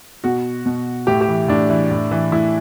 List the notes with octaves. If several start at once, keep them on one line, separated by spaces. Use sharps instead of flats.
B2 F#4
B2
A2 G4
G4
E3
A2 D4
E3
A2
E3
A2 E4